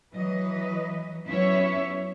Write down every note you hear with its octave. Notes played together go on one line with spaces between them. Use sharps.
E3 F#3 B4 D#5
F#3 B3 C#4 E4 C#5 E5